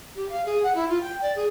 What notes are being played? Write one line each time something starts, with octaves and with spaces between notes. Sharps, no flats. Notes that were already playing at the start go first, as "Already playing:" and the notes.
G4
F5
G#4
F#5
E4
F4
G5
D5
G#4